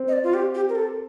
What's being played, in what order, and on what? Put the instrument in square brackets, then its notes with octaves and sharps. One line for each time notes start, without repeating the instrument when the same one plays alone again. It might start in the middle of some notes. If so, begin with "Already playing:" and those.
Already playing: [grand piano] C4
[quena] D#5
D5
F4
G4
G4
A#4
A4